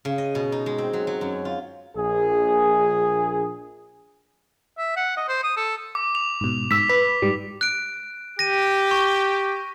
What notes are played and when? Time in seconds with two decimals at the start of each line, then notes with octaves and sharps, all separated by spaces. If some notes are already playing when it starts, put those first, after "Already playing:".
0.05 C#3
0.18 D#5
0.35 B2
0.52 D#4
0.66 G#3
0.78 C4
0.93 F#3
1.07 F#3
1.21 F#2
1.45 F4
1.95 A#1 G#4
4.78 E5
4.96 F#5
5.17 D#5
5.28 C5
5.43 D#6
5.57 A4
5.95 D6
6.15 F7
6.41 G#2 B2
6.71 G#2 E6 B6
6.89 B4 B6
7.22 G#2 G3
7.61 F#6 D7
8.39 G4 A#6 D#7
8.91 C#6